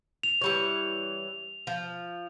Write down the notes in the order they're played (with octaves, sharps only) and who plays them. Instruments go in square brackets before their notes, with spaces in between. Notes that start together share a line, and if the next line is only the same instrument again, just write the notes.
[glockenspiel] F7
[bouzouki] E3 G3 C#5
F3